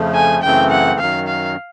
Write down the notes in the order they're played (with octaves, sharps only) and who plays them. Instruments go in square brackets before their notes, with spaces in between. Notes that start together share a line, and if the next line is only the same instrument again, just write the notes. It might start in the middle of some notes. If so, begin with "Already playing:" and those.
Already playing: [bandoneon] F2 C#3 F3 A3
[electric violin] G#5
[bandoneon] F#2 C#3 E3 A3 C4 [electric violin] G5
[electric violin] F#5
[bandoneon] F#2 D#3 F#3 [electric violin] F5
[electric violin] F5